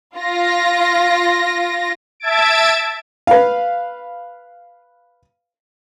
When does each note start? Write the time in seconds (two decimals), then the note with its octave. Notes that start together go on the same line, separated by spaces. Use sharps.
0.17 F4 A#6
2.20 E5 A5 E6 G#6 A6 D7
3.27 B4 F5